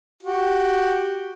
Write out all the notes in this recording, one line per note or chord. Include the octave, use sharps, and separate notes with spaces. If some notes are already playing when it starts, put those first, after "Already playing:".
F#4 G4